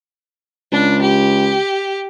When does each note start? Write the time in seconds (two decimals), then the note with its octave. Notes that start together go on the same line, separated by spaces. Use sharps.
0.72 C#2 D4
1.02 G4